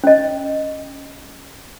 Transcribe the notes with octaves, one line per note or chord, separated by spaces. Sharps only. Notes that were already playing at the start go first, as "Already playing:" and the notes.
C#4 D#5